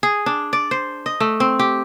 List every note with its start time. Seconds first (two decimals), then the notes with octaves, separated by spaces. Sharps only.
0.03 G#4
0.26 D4
0.53 D5
0.71 C5
1.06 D#5
1.20 A3
1.40 C4
1.59 G4